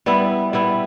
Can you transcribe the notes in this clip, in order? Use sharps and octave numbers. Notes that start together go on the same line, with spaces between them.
G3 B3 E4
G3 B3 E4